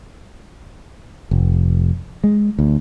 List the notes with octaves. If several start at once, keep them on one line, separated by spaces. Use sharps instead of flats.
F1
G#3
D2